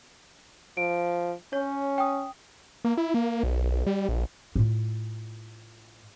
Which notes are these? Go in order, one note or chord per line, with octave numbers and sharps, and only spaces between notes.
F3 D7
C#4 C#5
G5 D#6
A#3
E4
A#3
B1
G3
A#1
A2 F4